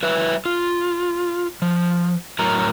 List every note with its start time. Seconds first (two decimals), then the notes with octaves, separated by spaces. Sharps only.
0.03 F#3 B4 E5
0.45 F4
1.62 F3
2.39 A2 F#3 A#4 A#5